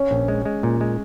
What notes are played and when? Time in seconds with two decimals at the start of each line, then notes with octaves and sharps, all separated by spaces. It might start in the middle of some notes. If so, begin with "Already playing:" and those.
Already playing: C#4 C#5
0.11 A#1
0.28 G#3
0.45 G#3
0.63 A#2
0.81 G#3